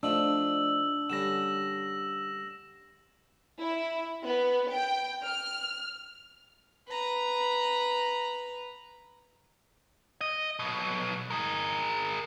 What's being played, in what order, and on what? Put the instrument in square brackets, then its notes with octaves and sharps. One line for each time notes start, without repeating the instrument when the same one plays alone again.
[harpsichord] F3 A3 D#4 [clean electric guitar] D4 [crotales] E6 F#7
[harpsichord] D3 G3 C#4 [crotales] A#6 E7
[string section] E4
B3
G5
F6
[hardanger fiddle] B4 A#5
[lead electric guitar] D#5
B2 F#3
G#4 A#4